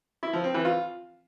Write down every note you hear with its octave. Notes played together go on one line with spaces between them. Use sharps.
E4
F3
C4
E3
F4